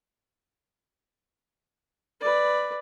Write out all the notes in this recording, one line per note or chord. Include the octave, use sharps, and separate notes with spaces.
B4 D5